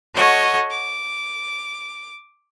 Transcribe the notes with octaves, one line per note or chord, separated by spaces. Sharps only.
F#4 A4 C#5 D#5 F#5
D6